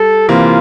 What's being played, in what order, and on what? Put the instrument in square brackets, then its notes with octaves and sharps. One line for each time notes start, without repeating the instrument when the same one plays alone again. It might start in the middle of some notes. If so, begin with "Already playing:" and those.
Already playing: [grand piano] G3 [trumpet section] A4
[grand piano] C3 E3 A#3 [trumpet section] F4